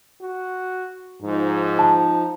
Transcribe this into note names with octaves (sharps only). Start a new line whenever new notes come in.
F#4
G#2 F3 D#4
A5